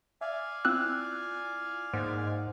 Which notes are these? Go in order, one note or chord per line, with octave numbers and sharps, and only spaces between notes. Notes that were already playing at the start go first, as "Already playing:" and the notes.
D5 E5 F5 G#5
C4 E4 F4 E6 F#6
G#2 A#3 C5 F#5